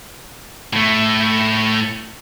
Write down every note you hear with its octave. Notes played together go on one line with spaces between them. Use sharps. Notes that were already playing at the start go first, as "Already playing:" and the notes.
A2 A3